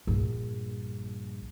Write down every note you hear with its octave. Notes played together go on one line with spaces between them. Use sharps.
A#1 G2